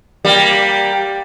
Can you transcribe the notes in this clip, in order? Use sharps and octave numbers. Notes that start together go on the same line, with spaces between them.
G3 A#3